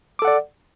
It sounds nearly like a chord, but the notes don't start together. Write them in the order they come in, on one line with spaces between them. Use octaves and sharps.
D6 A4 F#5 D5